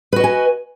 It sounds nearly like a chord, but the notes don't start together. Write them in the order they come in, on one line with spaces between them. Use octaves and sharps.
B4 F#4 D#5 G#5